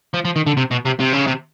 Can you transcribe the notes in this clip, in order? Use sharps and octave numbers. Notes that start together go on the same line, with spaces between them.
F3
F3
D#3
D3
C3
B2
C3
C3
C#3
C3